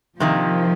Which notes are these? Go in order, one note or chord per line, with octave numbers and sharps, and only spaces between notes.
C3 D#3 F3 A#3